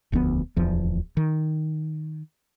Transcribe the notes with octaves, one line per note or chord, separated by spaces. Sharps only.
E1 D2 F3 B3
D1 E2 F3
D#3